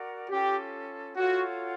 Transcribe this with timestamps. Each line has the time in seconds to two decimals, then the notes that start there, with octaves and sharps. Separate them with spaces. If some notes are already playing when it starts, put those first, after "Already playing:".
Already playing: F#4 A#4 D5 F#5
0.30 C#4 F4 G4 A4
1.16 F4 F#4 A4 C#5 F#5